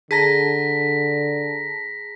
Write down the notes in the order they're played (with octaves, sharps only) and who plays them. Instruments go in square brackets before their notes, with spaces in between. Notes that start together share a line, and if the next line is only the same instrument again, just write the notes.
[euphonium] D3 [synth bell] G#4 A5 A#5 [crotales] A#6 B6